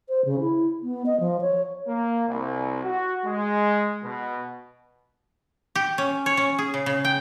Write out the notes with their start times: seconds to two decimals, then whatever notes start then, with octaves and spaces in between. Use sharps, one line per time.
0.09 C5
0.25 C#3
0.40 E4
0.83 B3
1.06 D#5
1.20 F3
1.41 C#5
1.87 A#3
2.28 C2
2.83 F#4
3.25 G#3
4.03 B2
5.75 G4
5.98 C#4
6.26 C#5
6.37 C#4
6.59 G#4
6.74 C#3
6.86 C#3
7.05 G5